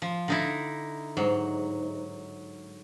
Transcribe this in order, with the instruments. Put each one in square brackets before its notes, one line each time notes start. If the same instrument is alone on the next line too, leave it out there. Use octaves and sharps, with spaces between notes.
[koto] F3
D3 D#4 E4
[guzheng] G#2 [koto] F#3